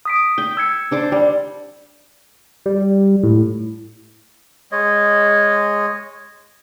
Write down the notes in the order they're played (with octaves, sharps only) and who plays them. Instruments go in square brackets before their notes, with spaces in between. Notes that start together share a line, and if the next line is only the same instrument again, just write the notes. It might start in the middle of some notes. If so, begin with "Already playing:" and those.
[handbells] D#6 B6 D7
[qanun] G5
[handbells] E6 G#6 C#7
[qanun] D4 C5 D6
G3
[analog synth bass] G3
A2
[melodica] G#3 C#5 D#5